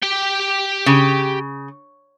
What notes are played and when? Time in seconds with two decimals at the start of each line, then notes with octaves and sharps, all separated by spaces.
0.03 G4 G5
0.86 C#3